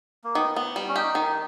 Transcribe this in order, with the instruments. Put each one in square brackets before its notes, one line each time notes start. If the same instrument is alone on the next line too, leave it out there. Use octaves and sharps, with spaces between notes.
[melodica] A#3
[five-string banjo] D#3 [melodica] B3
[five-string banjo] B3
G3
[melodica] C#4
[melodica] D#4 [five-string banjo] G4
[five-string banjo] D#3